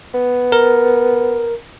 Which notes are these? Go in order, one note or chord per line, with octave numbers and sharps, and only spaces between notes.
B3
A#4